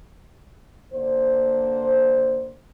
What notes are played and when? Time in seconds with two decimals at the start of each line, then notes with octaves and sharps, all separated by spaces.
0.93 D3 A#3 D4 C5